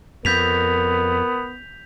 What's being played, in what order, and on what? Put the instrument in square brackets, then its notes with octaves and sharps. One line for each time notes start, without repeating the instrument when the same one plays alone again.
[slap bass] F2 [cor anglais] B3 [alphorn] A#4 [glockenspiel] G6 B6 F7